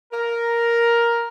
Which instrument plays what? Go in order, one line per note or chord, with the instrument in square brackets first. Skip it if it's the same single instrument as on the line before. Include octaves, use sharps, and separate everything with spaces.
[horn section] A#4